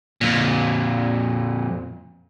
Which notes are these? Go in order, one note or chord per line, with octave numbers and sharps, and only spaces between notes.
F2 A#2